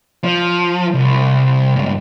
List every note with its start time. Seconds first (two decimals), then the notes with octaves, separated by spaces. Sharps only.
0.24 F3
0.94 C2
1.76 C#2 G2